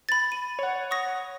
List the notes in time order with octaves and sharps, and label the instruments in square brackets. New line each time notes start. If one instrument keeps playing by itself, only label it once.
[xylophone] B5 A6
D#7
[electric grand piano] C#5 F#5
[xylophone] C#6 D#6 A#6